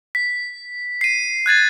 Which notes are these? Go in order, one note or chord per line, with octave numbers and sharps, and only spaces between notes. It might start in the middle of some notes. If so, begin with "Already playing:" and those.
B6
C7 D#7
F#6 G#6 A6 D#7